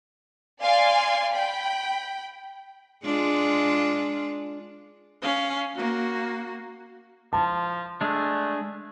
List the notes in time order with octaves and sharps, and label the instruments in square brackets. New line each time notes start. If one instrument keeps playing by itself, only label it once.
[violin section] D5 F5 G#5 C6
G5 B5
[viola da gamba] G#3 D4 F4
[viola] C#4 F5
A#3 F#4
[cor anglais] F3 [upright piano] A5
[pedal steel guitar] G#3 D4 [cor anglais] A3